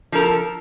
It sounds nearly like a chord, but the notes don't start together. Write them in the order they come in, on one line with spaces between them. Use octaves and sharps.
F3 A#4 A4